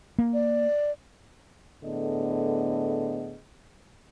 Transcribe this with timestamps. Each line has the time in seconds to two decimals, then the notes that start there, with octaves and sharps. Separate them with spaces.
0.18 A#3
0.33 D5
1.83 A2 D3 B3 G#4 D#5